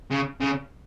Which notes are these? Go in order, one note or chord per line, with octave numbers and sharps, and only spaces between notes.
C#3
C#3